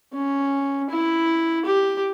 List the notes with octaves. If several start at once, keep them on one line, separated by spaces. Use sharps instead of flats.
C#4
E4
G4